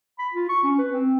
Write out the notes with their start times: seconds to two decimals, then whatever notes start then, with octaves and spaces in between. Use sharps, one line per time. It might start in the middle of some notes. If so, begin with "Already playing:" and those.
0.19 B5
0.33 F4
0.49 C#6
0.64 C#4
0.78 B4
0.92 C4